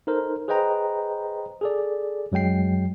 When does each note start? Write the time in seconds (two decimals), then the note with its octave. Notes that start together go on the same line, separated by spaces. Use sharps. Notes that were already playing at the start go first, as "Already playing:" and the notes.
0.07 D#4 A4 A#4 C5
0.48 G#4 B4 C5 D#5 G5 A#5
1.61 G#4 A4 D5
2.32 F#2 F#3 G#3 G5 C7